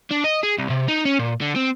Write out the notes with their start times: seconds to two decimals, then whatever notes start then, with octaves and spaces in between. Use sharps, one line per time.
0.11 D4
0.24 D#5
0.43 G#4
0.58 C2
0.70 C3
0.88 D#4
1.05 C#4
1.19 A#2
1.41 D3
1.56 C4